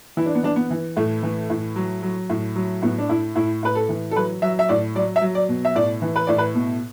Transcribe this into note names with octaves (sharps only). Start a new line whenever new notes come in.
E3 E4
D4
B3
E3 D4
B3
E3
A2 A3
E3
A2
F#3
F#3
A2
F#3
A2 B3
D4
A2 E4
A2 E4
A2 B4
A4
E3
A4
F#3 B4
F#3 E5
E5
A2 D5
F#3 D5
E5
F#3
D5
B2
E5
A2 D5
E3
B4
A2 D5
B4
B2